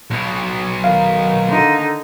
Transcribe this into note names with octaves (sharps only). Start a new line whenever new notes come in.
B1 B2
D#3 F5
D3 D#4